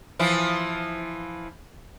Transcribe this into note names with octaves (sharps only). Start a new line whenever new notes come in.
E3 F3 E4